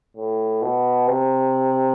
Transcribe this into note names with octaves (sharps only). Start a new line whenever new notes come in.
A2
B2
C3